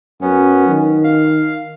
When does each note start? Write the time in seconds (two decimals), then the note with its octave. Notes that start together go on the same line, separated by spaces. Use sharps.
0.21 F#2 B3 C#4
0.68 D#3
1.04 F5